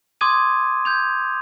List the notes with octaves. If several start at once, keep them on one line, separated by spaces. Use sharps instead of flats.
C6 D6 D#6 G#6 D#7
G6 G#6 F7